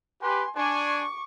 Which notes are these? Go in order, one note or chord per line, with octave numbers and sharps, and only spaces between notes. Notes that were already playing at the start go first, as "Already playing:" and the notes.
G4 B4 G#5 C6
D4 G#5 C#6 D6